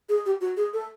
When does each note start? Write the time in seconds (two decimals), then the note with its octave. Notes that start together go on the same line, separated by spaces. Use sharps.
0.09 G#4
0.26 G4
0.41 F#4
0.57 G#4
0.73 A4